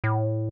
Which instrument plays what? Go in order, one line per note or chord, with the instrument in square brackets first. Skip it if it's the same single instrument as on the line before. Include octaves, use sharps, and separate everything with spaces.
[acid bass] A2